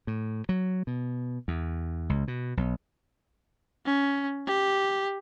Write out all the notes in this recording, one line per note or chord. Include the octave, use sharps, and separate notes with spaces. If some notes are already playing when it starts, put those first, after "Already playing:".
A2
F#3
B2
E2
C#2
B2
B1
C#4
G4